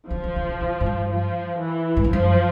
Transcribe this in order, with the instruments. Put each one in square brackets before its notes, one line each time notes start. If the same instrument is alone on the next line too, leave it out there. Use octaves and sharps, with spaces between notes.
[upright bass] D3 [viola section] F3
[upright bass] D#3
C#3
C3
C3
G#2
G2
[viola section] F3
E3
[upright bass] G#2
G2
[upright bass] F#2 [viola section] F3